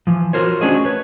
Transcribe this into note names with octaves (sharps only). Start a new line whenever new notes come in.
E3 F3
F4 F#4 A#4 C5 C#5
A3 C#4 D4 F#4 G#4 D#5
B4 C#5